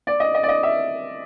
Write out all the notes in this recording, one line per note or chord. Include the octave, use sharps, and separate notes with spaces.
D5
D#5
D#5
D5
D#5
E5